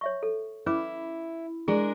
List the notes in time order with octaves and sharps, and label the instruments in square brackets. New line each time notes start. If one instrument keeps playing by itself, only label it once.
[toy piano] C#5 E5 C#6
A4
[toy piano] C#4 B4 D6 [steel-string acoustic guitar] E4
[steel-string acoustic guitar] G#3 D4 A#4 [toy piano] G#4